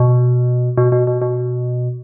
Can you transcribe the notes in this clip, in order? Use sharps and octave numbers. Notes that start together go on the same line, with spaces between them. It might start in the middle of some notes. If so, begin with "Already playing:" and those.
Already playing: B2
B2
B2
B2
B2